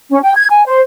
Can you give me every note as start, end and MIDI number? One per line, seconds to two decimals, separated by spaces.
0.11 0.19 61
0.23 0.33 79
0.35 0.46 92
0.49 0.63 80
0.66 0.80 72